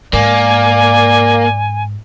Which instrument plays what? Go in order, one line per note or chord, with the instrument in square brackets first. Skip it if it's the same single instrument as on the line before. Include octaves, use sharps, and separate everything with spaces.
[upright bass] G#2 [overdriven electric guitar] A#3 [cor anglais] D5 [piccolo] G#5